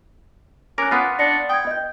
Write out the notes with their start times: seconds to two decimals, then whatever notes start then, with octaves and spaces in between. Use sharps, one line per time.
0.78 C#4 A#4 D6 F#6
0.91 B3 F4
1.19 D4 A#6 C#7
1.49 G5 D#6 G#6
1.67 D#5 G6